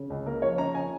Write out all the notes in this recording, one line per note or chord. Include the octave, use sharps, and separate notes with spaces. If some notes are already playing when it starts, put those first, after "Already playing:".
Already playing: C#3
C#2
A#3 A#4
F3 C#5
C#3 A#5
G#5